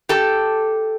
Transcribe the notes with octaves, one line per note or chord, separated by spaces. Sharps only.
G4 A4